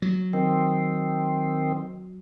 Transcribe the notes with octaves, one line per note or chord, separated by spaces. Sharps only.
F#3
D#3 C4